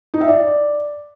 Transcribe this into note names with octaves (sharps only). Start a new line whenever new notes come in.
D#4
E5
D5